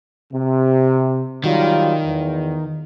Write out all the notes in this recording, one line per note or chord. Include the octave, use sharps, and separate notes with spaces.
C3
D#3 F#3 G3 F4
E2